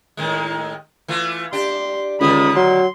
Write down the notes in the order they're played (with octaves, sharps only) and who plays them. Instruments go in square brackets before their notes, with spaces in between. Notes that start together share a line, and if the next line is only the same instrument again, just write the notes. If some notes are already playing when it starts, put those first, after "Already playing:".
[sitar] A2 D#3 G#3
E3 A3 F4
[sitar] D4 G4 [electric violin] C6
[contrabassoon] C#2 [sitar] D3 D#3 [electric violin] B5 D#6
[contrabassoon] F#3 [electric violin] C6